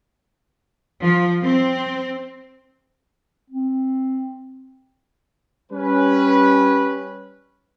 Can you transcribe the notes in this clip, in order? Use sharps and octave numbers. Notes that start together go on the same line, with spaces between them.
F3
C4
C4
G3 C#4 B4